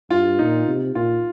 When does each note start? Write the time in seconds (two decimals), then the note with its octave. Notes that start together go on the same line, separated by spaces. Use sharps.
0.10 G2 F4
0.39 A#2 D#4
0.68 C3
0.95 A#2 F4